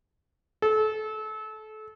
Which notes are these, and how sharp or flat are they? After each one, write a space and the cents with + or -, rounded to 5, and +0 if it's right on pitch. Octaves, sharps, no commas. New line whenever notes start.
A4 -30